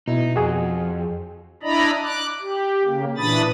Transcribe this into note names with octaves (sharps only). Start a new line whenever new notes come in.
B2 D#4 E4
F2 F#4 G#4
D4 E4 D5 D#5 A#5 B5
D6 F#6
G4
C#3 A#3
A#2 E3 D4 B5 D#6 A6